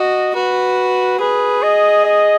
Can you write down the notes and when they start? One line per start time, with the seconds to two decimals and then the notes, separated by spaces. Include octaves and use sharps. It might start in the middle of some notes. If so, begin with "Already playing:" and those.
Already playing: F#4 D#5
0.35 F#4 B4
1.20 G#4 B4
1.63 D#5
2.05 D#5